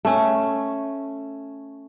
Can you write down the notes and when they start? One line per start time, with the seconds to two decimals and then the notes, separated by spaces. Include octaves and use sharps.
0.05 A3 C#4